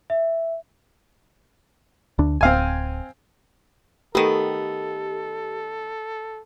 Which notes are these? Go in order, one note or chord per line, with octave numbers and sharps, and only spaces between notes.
E5
D2 D4
D1 C4 F5 G#5
D#3 A3 B3 G4 A4